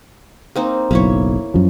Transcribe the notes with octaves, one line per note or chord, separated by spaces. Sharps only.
A#3 C4 D#4
F#1 B1 A#3 E4 C#5
F#2 F3